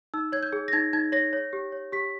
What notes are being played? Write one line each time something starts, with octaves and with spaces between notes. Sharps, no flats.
D#4 E6
C#5 G#6
G6
G#4
A#6
D#4 G#6
D#4 G#6
C#5 A#6
C#5
G4
C#5
G4 B6